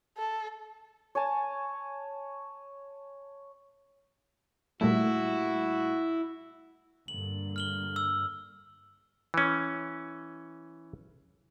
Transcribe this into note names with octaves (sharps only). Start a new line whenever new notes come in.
A4
C#5 G#5 A5
A#2 G3 A3 E4 F#4
G2 D3 A#3 F#7
F6 F#7 G7
E6
E3 C#4